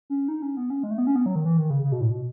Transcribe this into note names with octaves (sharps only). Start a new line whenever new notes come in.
C#4
D#4
C#4
B3
C#4
G#3
A3
B3
C#4
B3
F#3
D#3
E3
D#3
C#3
C#3
B2
A2
B2